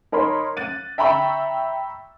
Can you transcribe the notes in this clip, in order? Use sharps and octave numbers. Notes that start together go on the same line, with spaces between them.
D#4 A#4 C#5 B5 C6
F#6 A6 D#7
E5 G5 A#5 B5 C#6 E6